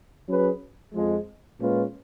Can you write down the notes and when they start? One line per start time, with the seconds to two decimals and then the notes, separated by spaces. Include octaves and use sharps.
0.28 F#3 C#4 G#4 B4
0.94 F2 F3 G#3
1.60 A#2 G#3 C#4 F4 B4